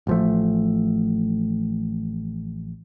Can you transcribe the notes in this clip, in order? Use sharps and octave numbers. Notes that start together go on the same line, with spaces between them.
A1 F3 A3